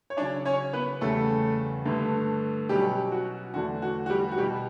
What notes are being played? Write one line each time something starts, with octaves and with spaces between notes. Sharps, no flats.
C#5
C#3 F#3 C#4 D4 D5
C#4 C#5
B3 B4
E2 C#3 G3 A3 C#4 A4
G2 D3 A3
B2 F#3 G3 C#4 G4
F#4
E2 D3 F#3 A3 D4 F#4
F#4
F#4
G3 G4
F#4
B2 G3 B3 G4